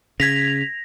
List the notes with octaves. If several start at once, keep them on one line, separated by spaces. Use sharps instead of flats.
C#3 G#6 A#6 B6 F7